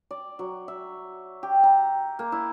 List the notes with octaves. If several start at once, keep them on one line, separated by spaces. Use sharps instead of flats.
D5
F#3
E5
G4
A#5
A#3
E4